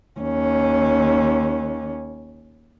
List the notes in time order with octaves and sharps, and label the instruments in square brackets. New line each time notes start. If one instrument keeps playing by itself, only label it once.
[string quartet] D#2 C#4